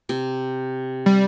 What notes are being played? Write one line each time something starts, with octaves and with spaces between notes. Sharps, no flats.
C3
G3